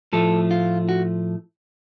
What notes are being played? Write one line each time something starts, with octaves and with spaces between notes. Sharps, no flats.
A2 F3 A3 A4
F4
F#4